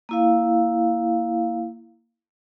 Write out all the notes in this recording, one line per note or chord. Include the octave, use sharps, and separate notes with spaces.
A#3 E4 F5